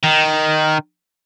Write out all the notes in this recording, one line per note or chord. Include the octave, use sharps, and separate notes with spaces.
D#3